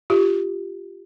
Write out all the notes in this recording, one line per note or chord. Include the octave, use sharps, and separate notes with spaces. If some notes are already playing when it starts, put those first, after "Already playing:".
F4 G4